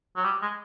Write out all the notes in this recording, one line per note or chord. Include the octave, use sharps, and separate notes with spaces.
F#3
G3
G#3